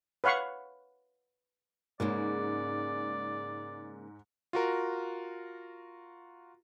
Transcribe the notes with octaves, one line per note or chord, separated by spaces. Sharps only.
B4 C#5 F5 F#5 C#6
G#2 C#3 G#3 A#3 D5
F4 F#4 A#4